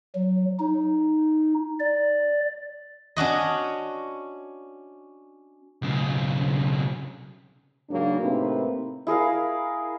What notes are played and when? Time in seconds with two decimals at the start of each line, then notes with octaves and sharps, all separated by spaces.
0.15 F#3
0.59 D#4
1.80 D5
3.16 C#4 D4 F#4 D#5
5.82 B1 C#3
7.90 G#2 C#3 F#3 A#3 D4
8.20 A2 C3 A#3 C4 D#4 B4
9.07 E4 G#4 A#4 F5